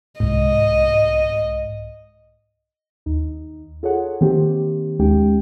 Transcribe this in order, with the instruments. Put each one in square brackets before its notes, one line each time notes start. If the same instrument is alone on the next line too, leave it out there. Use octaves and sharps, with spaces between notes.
[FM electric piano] C2 G#2 [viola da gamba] D#5
[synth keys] D#2 D#4
F4 G#4 A4 C#5 F#5
D#3 A#3 C4 G4
D#2 G#3 C#4 D#4 G4 G5